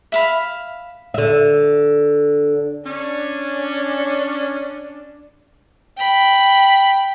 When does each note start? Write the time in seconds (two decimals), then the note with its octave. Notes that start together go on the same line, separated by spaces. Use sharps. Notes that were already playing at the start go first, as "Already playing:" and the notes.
0.12 E5 F5 B5
1.14 D3 E5
2.86 C#4 D4
5.98 G5 B5